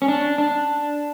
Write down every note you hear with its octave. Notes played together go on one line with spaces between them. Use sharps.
C#4
D4
D4